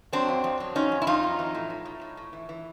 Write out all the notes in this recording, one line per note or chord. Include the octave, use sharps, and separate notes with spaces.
F#3 C4 D4
F2
F2
F#3
F2 C#4 D#4
F2
E4
F2 D#4 F4
F#3
E3
A2
A2
A2
A2
A2
E3
E3